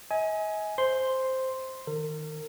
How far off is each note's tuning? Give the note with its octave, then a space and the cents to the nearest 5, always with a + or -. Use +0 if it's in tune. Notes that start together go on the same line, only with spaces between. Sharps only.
D#5 +45 G#5 +10
C5 +0 C6 +0
D#3 +0 A#4 -40